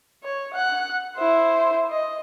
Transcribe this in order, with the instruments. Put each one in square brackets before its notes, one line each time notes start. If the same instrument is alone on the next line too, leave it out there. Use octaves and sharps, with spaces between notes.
[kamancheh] C#5
F#5 F#6
E4 C5
D#5